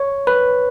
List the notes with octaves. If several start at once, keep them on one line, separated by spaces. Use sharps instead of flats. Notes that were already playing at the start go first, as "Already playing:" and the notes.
Already playing: C#5
B4